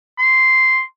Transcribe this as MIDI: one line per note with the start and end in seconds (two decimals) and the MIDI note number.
0.19 0.82 84